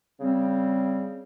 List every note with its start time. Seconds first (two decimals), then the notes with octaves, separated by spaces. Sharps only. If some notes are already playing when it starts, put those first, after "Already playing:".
0.20 C#3 G3 C4